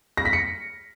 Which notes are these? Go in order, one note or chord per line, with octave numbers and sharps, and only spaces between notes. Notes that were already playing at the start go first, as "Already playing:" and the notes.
A#6
B6
C#7